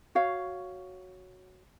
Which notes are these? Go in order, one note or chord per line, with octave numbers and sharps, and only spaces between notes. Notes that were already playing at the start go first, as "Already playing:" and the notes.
F#4 C#5 F5